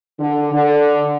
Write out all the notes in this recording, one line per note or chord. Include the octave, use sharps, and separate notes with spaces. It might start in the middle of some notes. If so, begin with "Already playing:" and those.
D3
D3